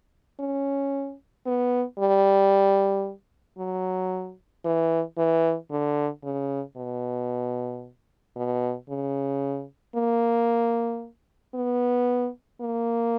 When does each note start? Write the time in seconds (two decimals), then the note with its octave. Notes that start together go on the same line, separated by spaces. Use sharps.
0.40 C#4
1.46 B3
1.99 G3
3.58 F#3
4.65 E3
5.18 E3
5.71 D3
6.24 C#3
6.77 B2
8.37 B2
8.89 C#3
9.96 A#3
11.55 B3
12.61 A#3